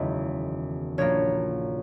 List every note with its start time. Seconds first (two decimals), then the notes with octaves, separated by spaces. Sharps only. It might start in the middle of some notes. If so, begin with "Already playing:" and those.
Already playing: F#1 E2 D#3 G#3 B3
0.98 A#1 A#2 A#3 C#5